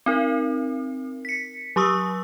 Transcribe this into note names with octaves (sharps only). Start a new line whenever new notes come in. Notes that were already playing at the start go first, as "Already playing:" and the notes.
C4 D#4 A#4
B6 C#7
F#3 G4 C#6 D#6 E6